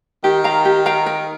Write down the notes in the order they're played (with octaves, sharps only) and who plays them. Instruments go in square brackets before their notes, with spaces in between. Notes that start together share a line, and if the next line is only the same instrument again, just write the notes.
[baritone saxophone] D#3 [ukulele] G4
[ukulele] A#4 F5 A#5
G4
A#4 F5 A#5
A#4